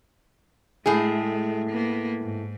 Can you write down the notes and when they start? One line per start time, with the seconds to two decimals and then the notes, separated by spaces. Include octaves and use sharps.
0.86 A2 G#3 A3 G#4
1.69 A#3 B3
2.21 G#2